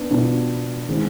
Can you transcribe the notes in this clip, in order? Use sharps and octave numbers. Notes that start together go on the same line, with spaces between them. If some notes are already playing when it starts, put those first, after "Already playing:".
Already playing: B3 D4
B2 B3 D4 F4
D#3 G#3 C4 D#4